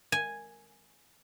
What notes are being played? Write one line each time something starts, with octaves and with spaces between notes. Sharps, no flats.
G#5